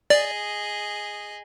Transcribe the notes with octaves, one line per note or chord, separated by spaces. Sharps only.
G#4 D5 D#5